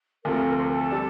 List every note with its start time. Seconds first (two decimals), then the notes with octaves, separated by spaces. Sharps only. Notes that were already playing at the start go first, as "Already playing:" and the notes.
0.25 D2 C3 F3 A3 A#4
0.47 A#4
0.56 C5
0.63 A#4
0.69 A4
0.91 C3 G3 D4